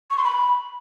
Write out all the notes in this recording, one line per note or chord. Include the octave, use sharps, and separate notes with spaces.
C#6
C6
B5